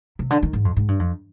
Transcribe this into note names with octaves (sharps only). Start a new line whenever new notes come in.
C3
D3
D#3
G#2
F2
G#2
G2
F2